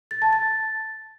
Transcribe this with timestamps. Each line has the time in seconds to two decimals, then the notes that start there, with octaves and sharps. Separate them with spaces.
0.11 A6
0.22 A5
0.33 A6